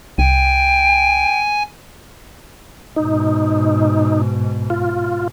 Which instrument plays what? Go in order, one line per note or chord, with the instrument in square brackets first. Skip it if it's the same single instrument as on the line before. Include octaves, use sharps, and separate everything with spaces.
[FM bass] C2 [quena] G5 [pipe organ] G#5
[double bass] G#2 B2 [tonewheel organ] D#4
[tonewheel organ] F4